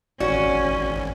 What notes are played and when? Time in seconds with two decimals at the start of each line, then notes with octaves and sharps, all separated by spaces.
0.20 G#1 C#4 F#4 D5